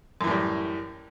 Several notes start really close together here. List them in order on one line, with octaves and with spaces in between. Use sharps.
F#2 E3 A2 G3